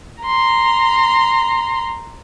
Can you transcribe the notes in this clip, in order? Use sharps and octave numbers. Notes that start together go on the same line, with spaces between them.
A#5 C6